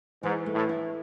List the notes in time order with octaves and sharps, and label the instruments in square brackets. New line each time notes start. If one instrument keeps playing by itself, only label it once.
[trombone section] G#2 [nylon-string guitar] E3
[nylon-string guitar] A3
[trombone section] A2
[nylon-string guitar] E4